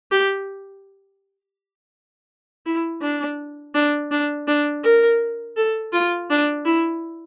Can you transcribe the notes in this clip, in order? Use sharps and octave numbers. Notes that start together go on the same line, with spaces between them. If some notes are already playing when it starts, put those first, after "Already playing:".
G4
E4
D4
D4
D4
D4
A#4
A4
F4
D4
E4